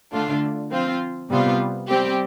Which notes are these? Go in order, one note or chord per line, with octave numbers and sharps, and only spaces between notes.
D3 A3 D4 F4
F3 C4 F4
C3 G3 B3 F4
G3 C4 G4